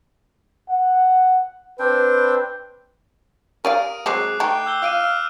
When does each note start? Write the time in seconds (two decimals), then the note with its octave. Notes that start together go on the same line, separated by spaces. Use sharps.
0.70 F#5
1.79 C4 D4 B4 G5
3.65 G4 A#4 D5 F5 D#6 D7 D#7
4.06 F#3 G#3 C4 G#4 D6 F#6 C7
4.40 A3 D#4 G5
4.66 E6 G6 G7
4.82 F5 D6 D7 D#7
5.00 E6 F6